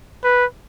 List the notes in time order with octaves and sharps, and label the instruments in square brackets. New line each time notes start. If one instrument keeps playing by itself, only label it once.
[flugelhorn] B4